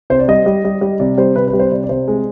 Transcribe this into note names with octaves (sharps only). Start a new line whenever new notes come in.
C3 C5
D5
G3 D#5
G3
G3
G3
C3 D5
G3 C5
C3 B4
B4
G3
C5
C3 D5
D5
C3 C5
G#3